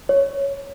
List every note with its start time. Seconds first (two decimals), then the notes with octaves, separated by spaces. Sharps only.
0.09 C#5